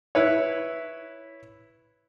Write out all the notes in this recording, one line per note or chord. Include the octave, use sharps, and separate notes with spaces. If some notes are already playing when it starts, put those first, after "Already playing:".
E4 B4 C#5